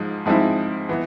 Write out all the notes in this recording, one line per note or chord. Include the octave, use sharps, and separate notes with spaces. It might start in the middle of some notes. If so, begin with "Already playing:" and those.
Already playing: G#2 F3 G#3
G#2 F3 G#3 C4 E4
E3 B3